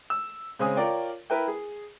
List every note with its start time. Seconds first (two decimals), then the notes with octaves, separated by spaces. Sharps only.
0.10 E6
0.59 C#3 G#3 C4 G#5 D#6
0.77 F4 A#4 C#5 D5 G5
1.30 E4 A#4 B4 E5 G5
1.48 G#4